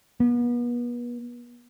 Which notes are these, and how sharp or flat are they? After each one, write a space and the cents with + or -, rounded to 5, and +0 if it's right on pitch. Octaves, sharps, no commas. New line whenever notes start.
B3 -35